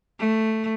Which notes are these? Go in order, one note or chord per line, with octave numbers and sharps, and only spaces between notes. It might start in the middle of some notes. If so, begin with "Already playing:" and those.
A3